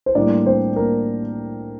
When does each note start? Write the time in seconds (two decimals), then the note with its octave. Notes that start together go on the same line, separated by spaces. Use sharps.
0.06 C5
0.15 A2 G3 A#3 D4 D5
0.46 C4 C5
0.76 A#3 A#4